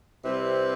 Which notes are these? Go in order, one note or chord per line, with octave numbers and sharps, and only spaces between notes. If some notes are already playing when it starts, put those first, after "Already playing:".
C3 G3 C4 E4 B4